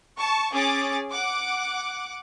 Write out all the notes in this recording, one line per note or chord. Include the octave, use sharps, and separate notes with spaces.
A5 C#6
C#4 G#4 D6 A6
F#5 D6